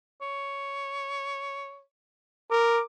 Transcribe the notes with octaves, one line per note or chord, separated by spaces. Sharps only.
C#5
A#4 D6